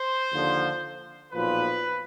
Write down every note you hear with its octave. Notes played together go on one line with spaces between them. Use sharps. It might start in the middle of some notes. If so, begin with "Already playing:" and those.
Already playing: C5
D#2 D3 F3
B1 A#2 F3 B4